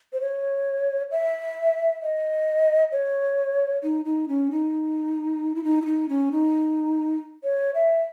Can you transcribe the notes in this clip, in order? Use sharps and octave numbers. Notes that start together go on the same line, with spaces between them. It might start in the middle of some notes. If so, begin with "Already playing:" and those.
C5
C#5
E5
D#5
C#5
D#4
D#4
C#4
D#4
E4
D#4
E4
D#4
C#4
D#4
C#5
E5